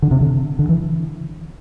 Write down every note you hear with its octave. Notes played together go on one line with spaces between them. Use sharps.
D3
C3
D3
D3
E3